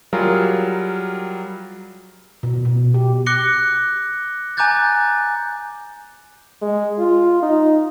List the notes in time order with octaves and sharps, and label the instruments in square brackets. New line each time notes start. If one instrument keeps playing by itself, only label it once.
[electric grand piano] F#3 G3 F4 G#4 A#4
[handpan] B2
B2
G4
[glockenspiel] D6 F#6 A#6 C#7 G7
G#5 A#5 D6 F#6 G6 A6
[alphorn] G#3
F4
D#4